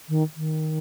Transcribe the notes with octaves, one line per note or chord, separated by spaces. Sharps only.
D#3
D#3